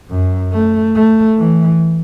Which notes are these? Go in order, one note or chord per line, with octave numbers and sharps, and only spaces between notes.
F#2
A3
A3
E3